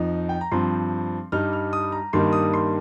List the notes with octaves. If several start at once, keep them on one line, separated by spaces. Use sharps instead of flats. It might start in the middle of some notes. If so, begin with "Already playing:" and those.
Already playing: F2 F3 D#4
G5
A#5
G2 F3 C4 C6
G2 G3 D#4 F6
F6
D#6
A#5
G2 D#3 G3 A#3 D#4 C6
D#6
C6